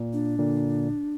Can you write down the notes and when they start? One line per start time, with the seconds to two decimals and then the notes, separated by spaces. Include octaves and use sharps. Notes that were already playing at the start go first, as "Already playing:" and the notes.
Already playing: A#2
0.13 D4
0.38 A#2 D3